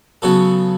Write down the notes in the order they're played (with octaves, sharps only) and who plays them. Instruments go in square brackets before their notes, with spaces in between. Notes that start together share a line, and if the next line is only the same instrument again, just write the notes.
[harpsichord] C#3 F#3 B3 F#4 A4